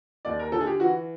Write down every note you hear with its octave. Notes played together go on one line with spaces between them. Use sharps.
D#2 D5
A#4
D3 A4
G#4
G4
E3 F#4